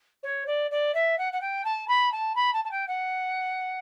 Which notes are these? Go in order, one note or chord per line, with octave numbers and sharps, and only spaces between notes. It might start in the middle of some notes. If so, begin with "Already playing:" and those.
C#5
D5
D5
E5
F#5
F#5
G5
A5
B5
A5
B5
A5
A5
G5
F#5